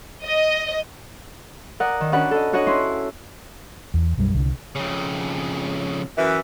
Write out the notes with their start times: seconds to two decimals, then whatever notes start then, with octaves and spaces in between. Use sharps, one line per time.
0.25 D#5
1.80 A#4 D5 F#5 D#6
2.01 D#3
2.12 C#4 D4 F#4 D5 F#5 B5
2.31 A4 D#5
2.53 D4 F#4 C#5 D#5 F#5
2.66 C#4 E4 C6
3.94 E2
4.17 B1 F#2 G3
4.35 C2 D3
4.76 F2 C#3
6.17 F#2 E3